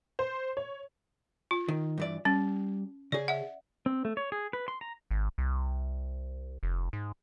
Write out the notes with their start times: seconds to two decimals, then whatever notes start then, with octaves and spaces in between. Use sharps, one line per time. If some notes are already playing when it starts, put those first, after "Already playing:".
0.19 C5
0.57 C#5
1.51 F4
1.68 D#3
1.98 G2 E3 D5
2.25 G3 C#4
3.12 C#3 G#4 D5
3.28 E5 F#5
3.86 C4
4.05 A3
4.17 C#5
4.32 G#4
4.53 B4
4.68 C6
4.81 A#5
5.11 G#1
5.38 C2
6.63 F1
6.93 G#2